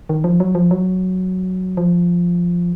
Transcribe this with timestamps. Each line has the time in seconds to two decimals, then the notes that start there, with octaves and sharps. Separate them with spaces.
0.09 D#3
0.24 F3
0.40 F#3
0.55 F3
0.71 F#3
1.77 F3